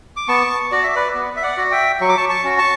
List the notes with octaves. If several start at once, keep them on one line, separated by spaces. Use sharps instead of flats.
D6
B3 A5 C#6
F#4 D5
E5
B4 D5
B3
E5
D5 F#5
F#4
E5 G5
F#3 C#6
D6
A5 C#6
A5 C#6
C#4 F#4
A5 C#6